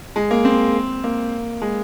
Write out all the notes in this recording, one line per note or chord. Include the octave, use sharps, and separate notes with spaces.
G#3
A#3
C4
A#3
G#3